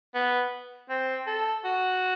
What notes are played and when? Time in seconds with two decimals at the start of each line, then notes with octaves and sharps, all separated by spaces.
0.14 B3
0.89 C4
1.27 A4
1.64 F#4